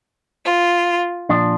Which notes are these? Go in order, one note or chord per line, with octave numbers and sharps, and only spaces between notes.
F4
A#2 F3 D4